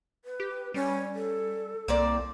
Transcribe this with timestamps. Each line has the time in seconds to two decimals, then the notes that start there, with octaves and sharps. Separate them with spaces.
0.25 B4
0.40 G4
0.74 G3 C#4
1.15 A4
1.88 C2 A#3 C4 D5